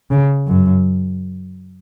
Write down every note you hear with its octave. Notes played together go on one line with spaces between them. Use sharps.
C#3
F#2